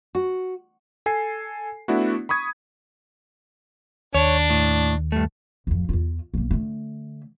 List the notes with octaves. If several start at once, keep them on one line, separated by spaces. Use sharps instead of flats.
F#4
A4 G#5 C7
A3 B3 D4 E4 F#4
B5 C#6 D#6 G#6
D#2 D4 C#5
A2
G2 A3
D1 F2
E2 F4
B1 A#3
D3 A3